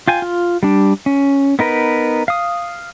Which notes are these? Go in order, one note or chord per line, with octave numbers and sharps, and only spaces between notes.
F4 G5 G#5
F4
G3 D4
C#4
B3 D#4 A#4 B4
F5 D#6